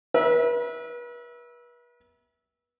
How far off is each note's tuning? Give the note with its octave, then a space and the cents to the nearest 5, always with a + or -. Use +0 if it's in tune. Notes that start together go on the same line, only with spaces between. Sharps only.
B4 -40 E5 -15